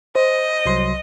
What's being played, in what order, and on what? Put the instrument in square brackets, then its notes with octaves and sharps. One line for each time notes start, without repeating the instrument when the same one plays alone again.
[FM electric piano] C5 [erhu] D#5
[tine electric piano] C2 F#3 C6